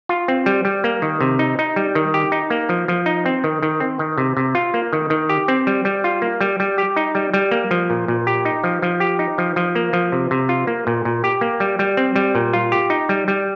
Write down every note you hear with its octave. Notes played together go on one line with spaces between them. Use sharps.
F4
C4
G3
G3
A#3
D#3
C3
D#4
D#4
G3
D#3
G4
D#4
A#3
F3
F3
D#4
C4
D#3
D#3
C4
D#3
C3
C3
F4
A#3
D#3
D#3
G4
C4
G3
G3
F4
A#3
G3
G3
G4
D#4
G3
G3
A#3
F3
A#2
A#2
G4
D#4
F3
F3
G4
D#4
F3
F3
A#3
F3
C3
C3
F4
A#3
A#2
A#2
G4
A#3
G3
G3
C4
G3
A#2
F4
G4
D#4
G3
G3